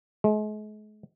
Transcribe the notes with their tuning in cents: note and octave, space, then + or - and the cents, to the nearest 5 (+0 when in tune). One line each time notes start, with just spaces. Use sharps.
G#3 +40